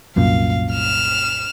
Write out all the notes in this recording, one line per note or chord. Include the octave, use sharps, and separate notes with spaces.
C2 F#2 A#2 F5
F6 E7